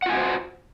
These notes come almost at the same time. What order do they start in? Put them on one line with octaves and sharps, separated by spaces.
F#5 F4 G#5 F#4 C5